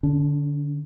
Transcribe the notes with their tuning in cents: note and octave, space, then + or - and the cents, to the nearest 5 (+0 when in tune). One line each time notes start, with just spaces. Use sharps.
D3 +0 C#4 +45